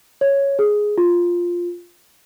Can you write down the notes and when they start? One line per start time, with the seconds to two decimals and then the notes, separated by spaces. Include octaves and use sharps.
0.21 C#5
0.59 G#4
0.98 F4